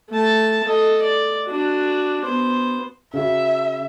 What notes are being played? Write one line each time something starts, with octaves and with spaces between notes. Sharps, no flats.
A3 A5
A4 D#5
D5
D4 F#4
B3 C5
C#3 F#4 E5